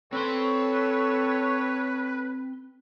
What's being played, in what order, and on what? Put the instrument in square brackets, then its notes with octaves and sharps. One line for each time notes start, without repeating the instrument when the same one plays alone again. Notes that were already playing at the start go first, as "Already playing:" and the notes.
[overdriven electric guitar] C4 C6 [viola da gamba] A4 [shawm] B4 [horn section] C#5